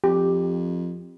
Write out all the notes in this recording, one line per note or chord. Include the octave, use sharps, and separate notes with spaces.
F2 G4